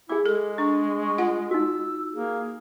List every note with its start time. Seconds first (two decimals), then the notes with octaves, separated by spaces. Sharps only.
0.09 E4 G#4 D6
0.26 G#3 A4
0.58 D4 C#6
1.18 F4 F#5
1.51 D#4 F#4 E6
2.13 A#3 G#4